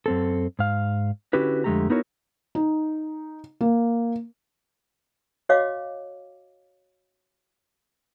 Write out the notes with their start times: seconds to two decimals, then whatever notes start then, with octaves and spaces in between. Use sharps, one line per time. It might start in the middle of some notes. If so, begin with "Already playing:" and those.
0.06 F#2 C4 A4
0.59 G#2 F5
1.33 D3 C#4 E4 F#4 G4 B4
1.64 F2 D3 G#3 A3 G4 A#5
1.90 B3 D#4 E4 F#4 A#4 C#5
2.55 D#4
3.61 A#3
5.49 F#4 C#5 D#5 F5 D6